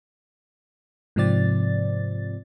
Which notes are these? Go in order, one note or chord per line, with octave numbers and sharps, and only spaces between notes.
G#2 C3 F3 C4 D5 A6